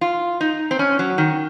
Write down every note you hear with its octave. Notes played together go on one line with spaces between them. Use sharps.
F4
D#4
C4
C#4
F#3
D#3